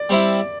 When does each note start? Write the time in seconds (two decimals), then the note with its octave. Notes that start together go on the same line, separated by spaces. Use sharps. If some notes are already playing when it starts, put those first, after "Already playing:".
Already playing: D5
0.09 G3 C4 E4